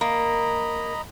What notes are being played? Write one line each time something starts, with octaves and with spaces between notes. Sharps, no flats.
A#3 D#5 A#5 B5